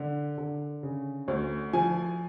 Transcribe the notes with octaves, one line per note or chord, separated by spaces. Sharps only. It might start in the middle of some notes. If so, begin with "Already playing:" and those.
Already playing: D3
D3
C#3
D2
F3 G#5